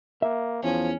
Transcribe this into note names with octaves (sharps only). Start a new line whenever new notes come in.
A#3 E5
E2 F3 C#4